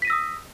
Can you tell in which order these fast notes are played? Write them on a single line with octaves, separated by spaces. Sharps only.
B6 D#7 A#6 E6 D#6